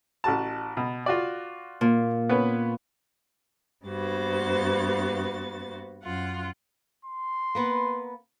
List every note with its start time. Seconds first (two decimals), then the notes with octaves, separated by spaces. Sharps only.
0.24 A1 F#4 A5
0.77 B2
1.06 F4 F#4 D5
1.81 A#2
2.29 B3 C#4 B4
3.86 G2 A#3 B3 F#4 C5 A6
6.03 F#2 F4 F#5
7.05 C6
7.55 A#3 B3 B4